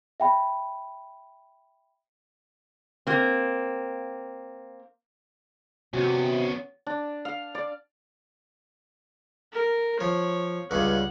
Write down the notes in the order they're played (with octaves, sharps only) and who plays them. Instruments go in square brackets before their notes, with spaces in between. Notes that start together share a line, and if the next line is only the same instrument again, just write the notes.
[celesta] E5 G5 B5
[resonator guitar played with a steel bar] A#3 C4
[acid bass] C3 [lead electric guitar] B3 C#4 [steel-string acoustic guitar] F#4
[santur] D4
F5
D5
[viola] A#4
[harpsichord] F3 [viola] C#5
[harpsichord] C#2 G2 C#3 [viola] F#5